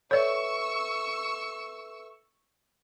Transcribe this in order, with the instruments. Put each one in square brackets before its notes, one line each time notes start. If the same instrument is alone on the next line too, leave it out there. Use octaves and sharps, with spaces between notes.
[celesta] A4 B4 E5 [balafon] C#5 D5 [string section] C#6 E6